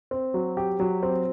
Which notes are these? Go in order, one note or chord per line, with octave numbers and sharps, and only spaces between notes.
C4
F#3
G4
F#3
C4